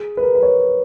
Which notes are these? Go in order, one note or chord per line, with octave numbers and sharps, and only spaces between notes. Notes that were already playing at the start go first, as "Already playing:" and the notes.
Already playing: G#4
B4
A#4
B4
C#5